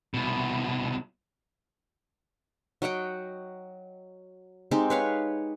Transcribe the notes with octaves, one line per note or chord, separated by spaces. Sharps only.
C2 B2
F#3 D#5 F#5 G5
G#3 C4 D#4 G4
B4 C#5 F5